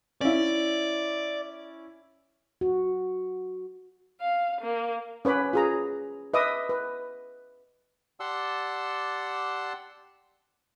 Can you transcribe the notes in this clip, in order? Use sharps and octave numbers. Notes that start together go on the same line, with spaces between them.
C#4 E4 D5
F#4
F5
A#3
C#4 B4 C#5 B5 D6
F4 G#4 A#5
B4 D#5 E5 D6 D#6
B4
G4 D5 F#5 A5 C6 E6